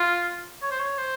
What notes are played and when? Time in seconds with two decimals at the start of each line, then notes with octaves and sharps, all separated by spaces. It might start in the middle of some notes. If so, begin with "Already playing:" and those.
Already playing: F4
0.62 C#5
0.71 C5
0.79 C#5
0.98 C5